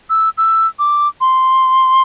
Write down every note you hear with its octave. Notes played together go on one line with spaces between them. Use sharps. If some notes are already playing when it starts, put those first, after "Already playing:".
E6
E6
D6
C6